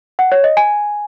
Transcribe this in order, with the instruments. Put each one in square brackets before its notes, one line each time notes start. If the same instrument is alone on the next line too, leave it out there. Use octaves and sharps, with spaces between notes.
[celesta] F#5
C#5
D#5
G#5